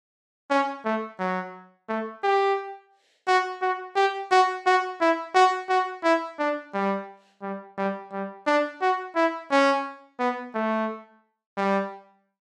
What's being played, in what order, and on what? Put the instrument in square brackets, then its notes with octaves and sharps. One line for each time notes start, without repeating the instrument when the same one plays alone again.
[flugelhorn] C#4
A3
F#3
A3
G4
F#4
F#4
G4
F#4
F#4
E4
F#4
F#4
E4
D4
G3
G3
G3
G3
D4
F#4
E4
C#4
B3
A3
G3